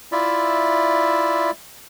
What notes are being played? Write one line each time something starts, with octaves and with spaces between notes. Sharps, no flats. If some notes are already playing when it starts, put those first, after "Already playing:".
E4 F4 D5 E5